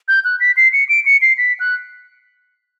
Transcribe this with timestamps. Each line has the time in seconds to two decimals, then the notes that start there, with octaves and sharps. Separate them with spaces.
0.08 G6
0.24 F#6
0.40 B6
0.57 C7
0.73 C#7
0.89 D7
1.06 C#7
1.22 C7
1.38 B6
1.60 F#6